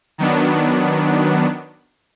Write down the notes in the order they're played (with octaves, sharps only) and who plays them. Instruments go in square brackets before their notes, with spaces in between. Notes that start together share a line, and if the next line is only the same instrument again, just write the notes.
[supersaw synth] D#3 F#3 B3 D4